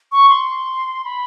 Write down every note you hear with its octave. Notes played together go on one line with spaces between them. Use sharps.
C#6
C6
B5